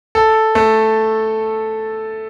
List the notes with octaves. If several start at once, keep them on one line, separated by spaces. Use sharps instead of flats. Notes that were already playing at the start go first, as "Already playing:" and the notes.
A4
A3